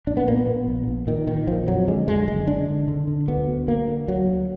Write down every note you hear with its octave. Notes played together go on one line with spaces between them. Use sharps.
A#1 D4
B3
A#2 A#3
B3
A#2
A#1
A#1
A#2 D#3
A#2 D#3
A#1 F3
F2 F#3
D3 G#3
D3 G#3
F#1 G#3
D3 D4
D3
D3
D3
D2 B3
D2
D2 A#3
D3
D2 F#3
D2